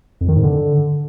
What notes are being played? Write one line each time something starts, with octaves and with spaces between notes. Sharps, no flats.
F2
D#3
G#2
D3